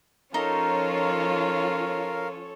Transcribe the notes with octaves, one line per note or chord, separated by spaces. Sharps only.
F3 C#4 D#4 F4 A4 A#4 C#5 F5